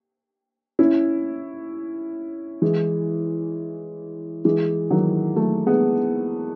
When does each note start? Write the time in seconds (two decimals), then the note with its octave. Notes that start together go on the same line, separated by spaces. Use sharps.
0.79 C#4 E4
2.62 E3 G#3
4.45 E3 G#3
4.91 D#3 F#3
5.36 F#3 A3
5.66 G#3 B3